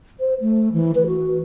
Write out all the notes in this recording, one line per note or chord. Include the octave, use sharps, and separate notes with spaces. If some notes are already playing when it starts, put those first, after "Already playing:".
C5
A3
E3
B4
F#4